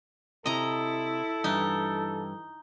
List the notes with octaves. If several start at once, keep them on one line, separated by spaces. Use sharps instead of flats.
C3 E4 A4 D#5 A#5
G2 E3 D#4